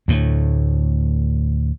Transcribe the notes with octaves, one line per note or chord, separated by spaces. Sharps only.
D2 A2